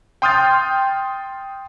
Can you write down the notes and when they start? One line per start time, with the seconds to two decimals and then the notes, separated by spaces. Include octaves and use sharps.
0.22 G5 C6 D#6 F6 G6 A6